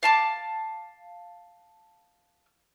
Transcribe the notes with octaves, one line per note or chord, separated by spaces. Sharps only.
F5 A5 C6 D6